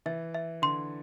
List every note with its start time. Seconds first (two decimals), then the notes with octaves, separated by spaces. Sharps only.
0.06 E3 E5
0.34 E5
0.62 D3 C6